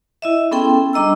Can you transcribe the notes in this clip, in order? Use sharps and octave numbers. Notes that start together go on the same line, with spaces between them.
E4 D#5 E5
B3 C#4 G#4 A4 G5 C6
G3 D4 D#5 A#5 E6